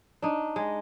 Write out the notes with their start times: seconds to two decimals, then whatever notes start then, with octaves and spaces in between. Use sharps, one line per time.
0.22 D4 D#4
0.56 G#3